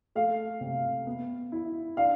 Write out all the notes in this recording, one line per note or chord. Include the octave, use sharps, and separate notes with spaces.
A3 F5
C3
B3
E4
D4 F5